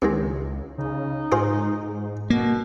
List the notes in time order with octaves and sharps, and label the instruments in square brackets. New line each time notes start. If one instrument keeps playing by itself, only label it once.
[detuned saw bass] C#2 [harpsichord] C3 D#3 G#3
[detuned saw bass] C#3 [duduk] D#4
[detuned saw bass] G#2 [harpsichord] F4 G#4 C5
[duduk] B2 [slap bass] A#3